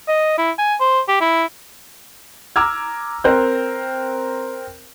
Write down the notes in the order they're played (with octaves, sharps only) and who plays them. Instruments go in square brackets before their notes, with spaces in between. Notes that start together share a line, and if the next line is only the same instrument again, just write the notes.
[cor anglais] D#5
E4
G#5
C5
G4
E4
[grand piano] A#5 D6 E6 F6 G#6
C4 A#4 C5 F#6 G6